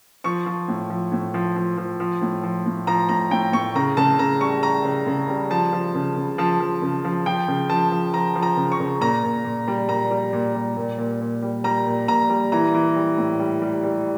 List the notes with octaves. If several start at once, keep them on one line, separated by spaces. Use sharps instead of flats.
F3 C#6
F3
A2
F3
A2
F3
F3
F3
F3
A2
F3
A2
F3 A#5
A2 A#5
A2 G5
A2 C#6
C#3 A#5
C#3 A5
C#3 A#5
G3 C#6
G3 A#5
C#3
C#3
G3
F3 A5
F3
C#3
C#3
F3 A5
F3
C#3
F3
F3 G5
C#3
F3 A5
F3
F3 A#5
F3
A#5
C#3
C#6
C#3
A#2 A#5
A#2
A#2
G3
A#2 A#5
G3
A#2
G3
A#2
A#2
A#2
G3
G3 A#5
A#2
A#2 A#5
G3
E3 A#5
E3
G3
A2
G3
G3
G3